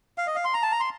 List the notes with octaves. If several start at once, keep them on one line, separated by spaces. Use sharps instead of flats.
F5
D#5
F5
C6
A#5
A5
A#5
C6